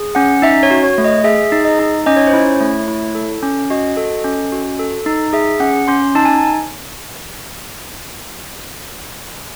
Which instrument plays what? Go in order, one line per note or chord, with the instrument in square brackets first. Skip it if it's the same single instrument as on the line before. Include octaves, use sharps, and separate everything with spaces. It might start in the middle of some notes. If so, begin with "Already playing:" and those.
Already playing: [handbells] G#4
C#4 F#5
D#4 E5
C#5
F#4
C#5
A3
D#5
G#4 E5
D#4
D#5
D#4
C#4 D#5
C#5
C5
E4 C#5
A3
E4
A4
C#4
F#4 D#5
A4
C#4
F#4
A4
D#4
G#4 E5
C#4 F#5
C#4 C6
D#4 A5
G#5